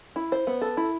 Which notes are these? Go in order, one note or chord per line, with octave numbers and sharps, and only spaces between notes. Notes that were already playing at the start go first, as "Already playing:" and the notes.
E4
C5
B3
A4
E4